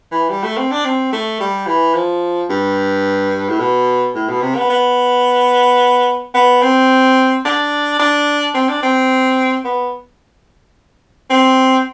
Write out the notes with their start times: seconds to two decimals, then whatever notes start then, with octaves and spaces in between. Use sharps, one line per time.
0.12 E3
0.30 G3
0.44 A3
0.57 C4
0.71 D4
0.85 C4
1.12 A3
1.40 G3
1.67 E3
1.95 F3
2.50 G2
3.49 A2
3.60 B2
4.15 A2
4.29 B2
4.42 C3
4.56 B3
4.70 B3
6.35 B3
6.62 C4
7.45 D4
8.00 D4
8.55 C4
8.69 D4
8.83 C4
9.65 B3
11.30 C4